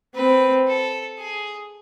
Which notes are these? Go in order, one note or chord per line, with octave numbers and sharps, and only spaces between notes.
C4 B4
A4
G#4